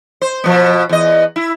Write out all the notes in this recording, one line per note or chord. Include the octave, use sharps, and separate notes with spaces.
C5
B2 F3 B3
E2 D#5
E4